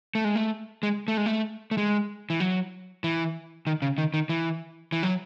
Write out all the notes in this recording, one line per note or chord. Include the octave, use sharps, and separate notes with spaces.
A3
G#3
A3
G#3
A3
G#3
A3
A3
G#3
E3
F#3
E3
D#3
C#3
D#3
D#3
E3
E3
F#3